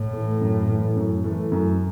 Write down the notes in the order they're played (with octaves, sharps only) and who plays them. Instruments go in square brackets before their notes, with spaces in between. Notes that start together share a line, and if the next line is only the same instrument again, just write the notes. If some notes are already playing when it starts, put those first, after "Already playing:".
Already playing: [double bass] A2
[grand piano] E3 A3
F#2
E3 A3
F#2
E3 A3
F#2